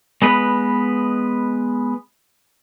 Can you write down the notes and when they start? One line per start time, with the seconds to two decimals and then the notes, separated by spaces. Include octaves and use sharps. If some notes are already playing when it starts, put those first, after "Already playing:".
0.22 G#3 B3 B4